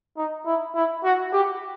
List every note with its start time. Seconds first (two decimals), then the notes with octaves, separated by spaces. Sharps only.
0.17 D#4
0.46 E4
0.75 E4
1.04 F#4
1.33 G4